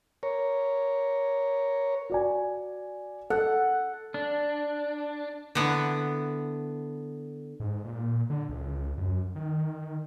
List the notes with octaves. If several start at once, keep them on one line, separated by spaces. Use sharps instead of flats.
A#4 C#5
F#4 D5 G#5
A4 F#5
D4
D3 B3 E4
G#2
A#2
D3
C#2
F#2
D#3